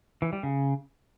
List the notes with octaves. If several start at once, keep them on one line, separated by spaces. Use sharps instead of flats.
E3
G3
C#3